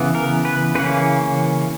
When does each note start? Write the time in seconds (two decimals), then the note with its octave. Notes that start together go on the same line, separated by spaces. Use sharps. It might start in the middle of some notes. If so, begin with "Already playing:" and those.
Already playing: C#3 E3 B3
0.15 A#4
0.45 B4
0.75 C#3 E3 A#3 C#4 B4